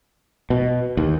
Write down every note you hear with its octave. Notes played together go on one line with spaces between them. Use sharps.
B2
D#2